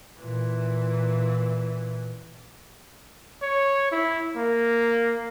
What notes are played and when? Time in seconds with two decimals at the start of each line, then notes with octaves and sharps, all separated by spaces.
0.20 A#2 E3
3.42 C#5
3.91 E4
4.36 A#3